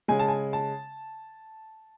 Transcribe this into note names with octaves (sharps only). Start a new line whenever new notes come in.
C#3 G#3 G#5
A5
G#5
A5